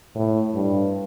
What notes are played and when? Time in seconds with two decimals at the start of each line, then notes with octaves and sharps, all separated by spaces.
0.15 A2
0.54 G2